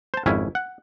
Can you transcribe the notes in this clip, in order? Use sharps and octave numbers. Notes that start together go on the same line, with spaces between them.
C5 A5
G#1 F2 C#4 E4 G#5
F#5